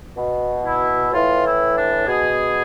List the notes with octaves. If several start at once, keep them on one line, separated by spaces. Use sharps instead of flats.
B2
E4
A2 E3 F4
E4
D4
B2 G#4